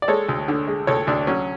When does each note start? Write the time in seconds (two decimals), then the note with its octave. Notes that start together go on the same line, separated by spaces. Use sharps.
0.02 D5
0.08 G#3 A4 C#5
0.29 D2
0.48 D3
0.67 G#3
0.87 D2 A4 C#5
1.07 D2 D4
1.27 F#3 C#4